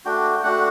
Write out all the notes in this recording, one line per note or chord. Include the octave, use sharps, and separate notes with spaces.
A3 D4 F#4 G5
G5
A3 D4 F#4 F#5